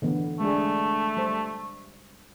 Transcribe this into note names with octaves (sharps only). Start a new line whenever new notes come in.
D3 E3 B3
G#3 A3 D4 G#4
G3 C5